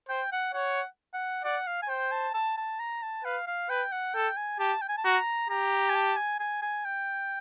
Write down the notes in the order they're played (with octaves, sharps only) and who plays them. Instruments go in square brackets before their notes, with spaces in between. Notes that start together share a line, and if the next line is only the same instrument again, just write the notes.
[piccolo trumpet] C5 [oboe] G5
[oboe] F#5
[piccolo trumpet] C#5 [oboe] F#5
[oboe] F#5
[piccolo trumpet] D5 [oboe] F#5
[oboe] F5
G#5
[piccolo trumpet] C5 [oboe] G5
[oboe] A5
A5
A5
A#5
A5
[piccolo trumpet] B4 [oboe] F5
[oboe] F5
[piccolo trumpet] B4 [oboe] G5
[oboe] F#5
[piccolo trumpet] A4 [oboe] G5
[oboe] G#5
[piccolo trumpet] G4 [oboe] A5
[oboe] G5
G#5
A5
[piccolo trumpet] F#4 [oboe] A#5
[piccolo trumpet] G4 [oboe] A#5
[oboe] G#5
A5
G#5
G#5
G#5
G5